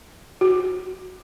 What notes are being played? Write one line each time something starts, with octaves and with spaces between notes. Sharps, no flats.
F#4